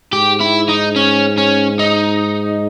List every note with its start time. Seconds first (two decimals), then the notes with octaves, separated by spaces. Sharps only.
0.12 G#2 G4
0.40 E4
0.68 D#4
0.96 C#4
1.38 C#4
1.79 D#4